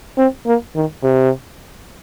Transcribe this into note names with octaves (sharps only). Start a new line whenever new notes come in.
C4
A#3
D#3
C3